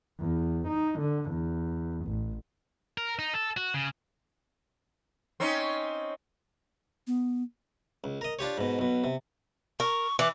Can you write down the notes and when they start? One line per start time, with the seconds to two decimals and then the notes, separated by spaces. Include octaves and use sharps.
0.20 E2
0.68 D#4
0.99 D3
1.30 E2
2.06 A1
2.98 A#4
3.19 D#4
3.34 A4
3.57 F#4
3.74 C#3
5.40 C4 C#4 D#4
7.07 B3
8.04 C#2
8.21 A#4 D#5
8.39 D4 F4 G4 C#5
8.58 G#2 B2
8.79 B1 B2
9.04 C3
9.80 A#4 C#6
10.19 E3 D6